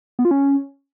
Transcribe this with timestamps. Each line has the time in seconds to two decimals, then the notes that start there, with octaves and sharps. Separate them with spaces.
0.19 B3
0.25 F4
0.31 C#4